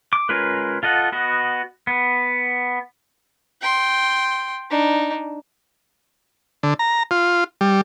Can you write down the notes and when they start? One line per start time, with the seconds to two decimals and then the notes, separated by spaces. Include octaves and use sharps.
0.13 D6
0.29 G#3 C#4 F4 A#4 B4
0.83 F4 A4 D#5 F#5
1.12 B3 F#4 D#5
1.87 B3
3.61 G5 C6
4.70 D4 D#4
6.63 D3
6.79 A#5
7.11 F4
7.61 G3